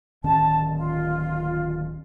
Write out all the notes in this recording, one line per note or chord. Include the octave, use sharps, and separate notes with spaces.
D1 D#3 C#4 A5
F4